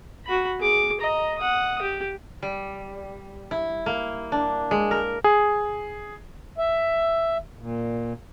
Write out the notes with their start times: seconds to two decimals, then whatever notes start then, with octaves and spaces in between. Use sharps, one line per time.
0.25 F#4 B5
0.59 G#4 D6
1.00 D#5 A#5
1.38 F#5 D#6
1.82 G4
2.42 G3
3.51 E4
3.86 A#3
4.32 D4
4.71 G#3
4.91 A#4
5.24 G#4
6.58 E5
7.59 A#2